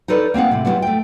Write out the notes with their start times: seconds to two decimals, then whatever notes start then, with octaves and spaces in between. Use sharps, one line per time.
0.08 D#4 E4 A4 B4 C#5 D5
0.34 A#3 C4 F5 F#5
0.51 A2 C3
0.65 F#3 B3 D4 E4 F4 G4
0.82 A3 G5